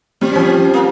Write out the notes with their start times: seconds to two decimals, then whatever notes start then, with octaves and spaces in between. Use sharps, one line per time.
0.21 G3 C4
0.31 C#4
0.36 F3 C4
0.74 A#3